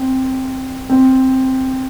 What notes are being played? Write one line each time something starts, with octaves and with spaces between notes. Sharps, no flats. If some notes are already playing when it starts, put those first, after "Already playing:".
Already playing: C4
C4